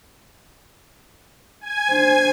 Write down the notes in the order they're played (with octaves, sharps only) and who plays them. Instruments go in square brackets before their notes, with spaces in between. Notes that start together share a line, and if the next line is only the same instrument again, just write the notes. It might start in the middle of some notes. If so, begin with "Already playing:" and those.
[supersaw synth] G#5 G#6
[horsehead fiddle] D4 C5